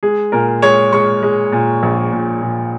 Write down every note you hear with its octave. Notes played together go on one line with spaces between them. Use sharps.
G#3 G#4
A#2 A#4
G#3 C#5
G#3 C#6
G#3
A#2
A#1
A#2
A#2